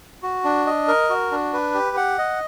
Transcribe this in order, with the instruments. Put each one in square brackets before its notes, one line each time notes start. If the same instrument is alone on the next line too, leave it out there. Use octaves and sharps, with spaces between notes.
[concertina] F#4
D4
D#5
A#4
F#4
D4
B4
G4
F#5
D#5